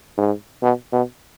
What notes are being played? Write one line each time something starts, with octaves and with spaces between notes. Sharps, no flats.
G#2
B2
B2